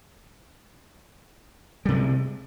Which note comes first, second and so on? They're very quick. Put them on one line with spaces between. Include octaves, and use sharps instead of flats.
G3 C3 A#3 G#3